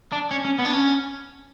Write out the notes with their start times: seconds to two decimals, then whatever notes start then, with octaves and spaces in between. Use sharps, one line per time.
0.12 D4
0.31 C#4
0.45 C#4
0.59 B3
0.66 D4
0.73 C#4